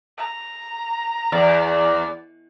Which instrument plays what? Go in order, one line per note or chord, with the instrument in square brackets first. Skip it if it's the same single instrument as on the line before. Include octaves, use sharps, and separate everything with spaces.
[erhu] A#5
[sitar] E2 [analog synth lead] D5